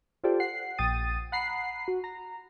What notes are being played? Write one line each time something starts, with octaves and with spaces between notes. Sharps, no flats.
F4 G4 A4 C5 D5 G5
F#5 C7
A#1 G5 D#6 A6 D#7
F#5 A#5 B5 C7
F#4
A#5